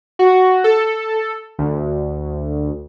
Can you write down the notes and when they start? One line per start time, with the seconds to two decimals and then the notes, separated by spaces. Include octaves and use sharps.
0.19 F#4
0.64 A4
1.59 D2